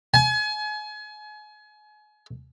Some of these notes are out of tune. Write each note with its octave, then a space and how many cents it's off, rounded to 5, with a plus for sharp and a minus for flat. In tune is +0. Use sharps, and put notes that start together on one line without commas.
G#5 +35